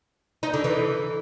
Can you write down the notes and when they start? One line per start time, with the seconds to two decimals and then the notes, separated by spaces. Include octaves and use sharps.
0.43 D#4
0.54 D3
0.64 E3